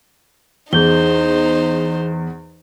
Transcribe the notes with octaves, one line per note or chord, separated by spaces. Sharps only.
E2 D#4 G#4 C5 G6 G7